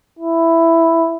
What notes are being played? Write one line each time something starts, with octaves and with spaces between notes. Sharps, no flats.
E4